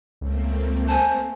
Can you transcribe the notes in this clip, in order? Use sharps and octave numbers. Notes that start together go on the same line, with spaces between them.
C#2 A3 A#3 C4
C5 G#5 A5